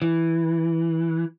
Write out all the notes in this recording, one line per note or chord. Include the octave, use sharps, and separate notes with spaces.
E3